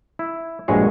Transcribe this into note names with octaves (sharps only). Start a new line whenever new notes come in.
E4
A#1 G2 F#3 G#3 G#4 C#5